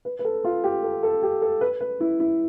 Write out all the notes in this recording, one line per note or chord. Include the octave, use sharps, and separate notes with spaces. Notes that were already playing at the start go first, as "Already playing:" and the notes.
B4
B4
A4
F4
G4
A4
A4
G4
A4
B4
B4
E4
E4